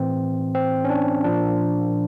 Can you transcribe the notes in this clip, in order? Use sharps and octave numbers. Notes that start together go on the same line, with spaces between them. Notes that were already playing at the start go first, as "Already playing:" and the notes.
Already playing: A2 E3 C4
C4
C#4
D4
A#2 F3 D4